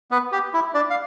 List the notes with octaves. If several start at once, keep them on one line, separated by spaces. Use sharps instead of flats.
B3 B4
G4
E4
D4 D5
F5